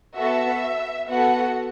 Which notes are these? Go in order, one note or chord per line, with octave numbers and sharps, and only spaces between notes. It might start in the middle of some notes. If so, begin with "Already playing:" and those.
B3 F#4 A4 E5
B3 F#4 A4 F#5